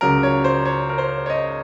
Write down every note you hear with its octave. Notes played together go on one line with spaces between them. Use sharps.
C#2 C#3 F#3 A#4
C#5
C5
C#5
A#4
C5
C#5
D#5